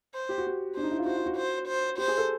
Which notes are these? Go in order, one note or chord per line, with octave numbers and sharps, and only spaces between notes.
C5
G4
F#4
G4
D4 C5
D#4
E4
F4
F#4 C5
F4
F#4
C5
C5
G4 C5
G#4
A4